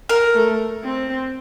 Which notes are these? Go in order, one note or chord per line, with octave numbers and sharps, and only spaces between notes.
A#4
A3
C4